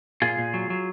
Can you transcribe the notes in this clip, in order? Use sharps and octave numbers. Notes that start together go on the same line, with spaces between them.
A#2 F4 G#4
A#2
F#3
F#3